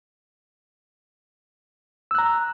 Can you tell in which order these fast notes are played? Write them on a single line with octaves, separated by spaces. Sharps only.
E6 F#6 A#5